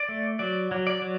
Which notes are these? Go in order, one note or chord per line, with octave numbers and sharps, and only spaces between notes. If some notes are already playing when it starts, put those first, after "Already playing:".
Already playing: D5
A3
F#3 D5
F#3
D5
F#3